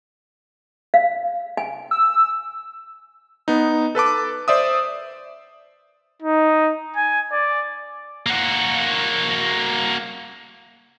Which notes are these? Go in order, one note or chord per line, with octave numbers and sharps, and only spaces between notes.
F5
G#5
E6
B3 D#4
A4 B4 A5 D6
C5 D5 E5 D#6
D#4
G#5
D5
A#3 F#4